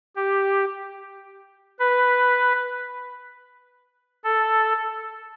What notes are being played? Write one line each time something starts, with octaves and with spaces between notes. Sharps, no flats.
G4
B4
A4